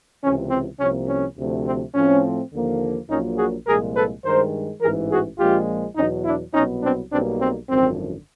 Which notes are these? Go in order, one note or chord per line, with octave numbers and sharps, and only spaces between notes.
C#2 C3 E3 C#4
C4
C2 C3 F3 A#3 C#4
C#4
D2 C3 F3 A3
C4
A2 F3 A3 C4 C#4
D#2 D3 F3 A#3
A#1 A#2 F#3 A#3 C#4 D#4
F#4 G#4
C2 A#2 F3 G#3 G#4 A#4
A4 B4
G2 D#3 G#3 A#4 C5
A1 G#2 E3 G#4 A#4
F#4 G#4
A#1 A#2 F3 G#3 F4 G4
E2 B2 F#3 C#4 D#4
D4 E4
C2 B2 F#3 B3 C#4 D#4
C4 D4
B1 B2 G3 A#3 C4 D4
C4
G#1 F#2 D3 F3 C4